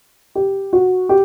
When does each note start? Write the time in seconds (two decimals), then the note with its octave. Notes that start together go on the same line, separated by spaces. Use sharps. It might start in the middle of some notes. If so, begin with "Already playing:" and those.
0.35 G4
0.73 F#4
1.09 G4